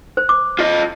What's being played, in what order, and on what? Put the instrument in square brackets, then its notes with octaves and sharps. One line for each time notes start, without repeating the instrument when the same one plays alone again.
[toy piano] C5
D6
[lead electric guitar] F4 D#5